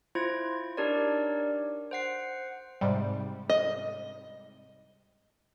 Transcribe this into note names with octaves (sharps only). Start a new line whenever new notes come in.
E4 F4 C5 G#6
D4 D#4 G4 A#4 C#5 D5
C5 F#5 C7
G#2 C3 G3
D#5